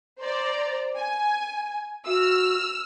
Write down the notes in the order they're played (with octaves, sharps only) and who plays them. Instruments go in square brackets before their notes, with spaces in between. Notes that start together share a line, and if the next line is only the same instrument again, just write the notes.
[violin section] C5 D5 A#5
G#5
[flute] F#4 [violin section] E6 F6